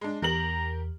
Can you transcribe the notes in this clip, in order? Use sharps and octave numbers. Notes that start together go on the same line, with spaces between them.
G#3 D4
E2 G4 A#4 A#5 F#7